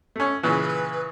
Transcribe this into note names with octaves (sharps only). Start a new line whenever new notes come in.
A3 C#4
A#2 C#3 E3 B4